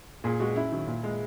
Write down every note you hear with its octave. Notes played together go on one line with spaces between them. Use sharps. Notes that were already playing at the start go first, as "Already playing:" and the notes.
A#2 G#4
G#3 F#4
F#2 E4
D#3 F#3
A#2
G#3